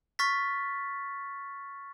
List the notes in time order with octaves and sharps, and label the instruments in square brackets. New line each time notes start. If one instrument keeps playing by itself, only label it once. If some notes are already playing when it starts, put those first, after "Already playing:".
[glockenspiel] C#6 F6 A6 B6